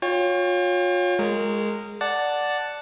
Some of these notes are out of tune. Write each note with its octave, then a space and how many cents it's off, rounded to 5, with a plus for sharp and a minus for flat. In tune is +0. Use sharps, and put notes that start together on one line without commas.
F4 +35 C#5 +0 G5 +40
G#3 +0 A#4 -25
D5 +0 F#5 +0 A5 +0